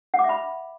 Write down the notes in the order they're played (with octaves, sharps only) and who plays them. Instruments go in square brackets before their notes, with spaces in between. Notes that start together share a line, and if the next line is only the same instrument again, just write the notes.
[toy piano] F#5
D6
E5
B5